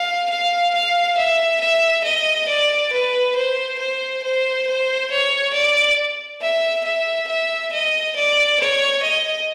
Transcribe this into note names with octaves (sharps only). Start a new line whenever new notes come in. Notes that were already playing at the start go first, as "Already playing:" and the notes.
Already playing: F5
F5
F5
E5
E5
D#5
D5
B4
C5
C5
C5
C5
C#5
D5
E5
E5
E5
D#5
D5
C#5
D#5